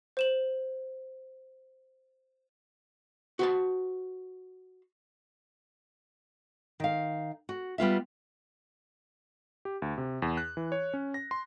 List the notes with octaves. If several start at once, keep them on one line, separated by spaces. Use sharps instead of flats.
C5 E7 F#7
F#4 C5 A5
D#3 F5
F#4
G3 B3 F4 E5
G4
D2
C3
E2
F#6
E3
C#5
C#4
A#6
C6